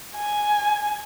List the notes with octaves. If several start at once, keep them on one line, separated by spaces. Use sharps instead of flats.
G#5